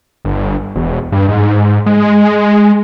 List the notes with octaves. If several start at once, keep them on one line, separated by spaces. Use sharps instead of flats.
G1
E1
G2
G#2
G#3